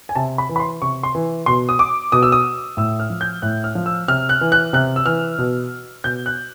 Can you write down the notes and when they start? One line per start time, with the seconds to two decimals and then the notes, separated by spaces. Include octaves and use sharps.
0.09 G#5
0.15 C3 A5
0.38 B5
0.49 E3
0.56 B5
0.60 C6
0.82 C3 C#6
1.03 C6
1.15 E3
1.46 B2 C6
1.69 D#6
1.79 D6
2.12 B2 D#6
2.23 E6
2.32 D#6
2.77 A2 E6
3.00 F6
3.10 F3
3.21 G6
3.42 A2 F#6
3.64 F6
3.75 F3
3.86 E6
4.08 C3 F6
4.29 F#6
4.41 E3
4.52 F#6
4.73 C3 F#6
4.96 E6
5.06 E3 F6
5.38 B2
6.04 B2 G6
6.26 F#6